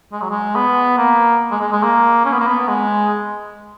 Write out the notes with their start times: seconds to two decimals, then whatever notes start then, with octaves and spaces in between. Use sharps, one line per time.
0.12 G#3
0.22 F#3
0.30 G#3
0.55 B3
0.97 A#3
1.51 G#3
1.61 G#3
1.72 G#3
1.83 A#3
2.25 C#4
2.32 B3
2.40 A#3
2.47 B3
2.68 G#3